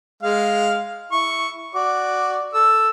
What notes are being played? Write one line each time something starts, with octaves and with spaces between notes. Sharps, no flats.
G#3 F5 F6
E4 C#6
F#4 D5 D6
A4 E6